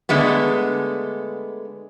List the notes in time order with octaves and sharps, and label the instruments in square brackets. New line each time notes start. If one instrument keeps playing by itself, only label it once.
[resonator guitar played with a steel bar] D3 G#3 A3 B3